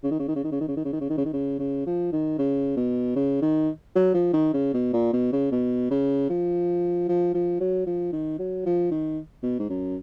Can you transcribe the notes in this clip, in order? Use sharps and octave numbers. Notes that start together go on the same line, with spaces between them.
C#3
D#3
C#3
D#3
C#3
D#3
C#3
D#3
C#3
D#3
C#3
D#3
C#3
D#3
C#3
D#3
C#3
C#3
F3
D#3
C#3
B2
C#3
D#3
F#3
F3
D#3
C#3
B2
A#2
B2
C#3
B2
C#3
F3
F3
F3
F#3
F3
D#3
F#3
F3
D#3
B2
G#2
F#2